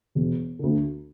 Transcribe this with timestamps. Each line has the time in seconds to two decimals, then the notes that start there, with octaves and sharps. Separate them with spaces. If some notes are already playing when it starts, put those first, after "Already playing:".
0.15 E1
0.59 D2 D3